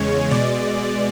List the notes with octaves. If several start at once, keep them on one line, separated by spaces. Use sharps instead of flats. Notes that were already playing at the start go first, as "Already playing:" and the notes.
Already playing: E2 C#3 G#3 C#5
B2 G#3 D5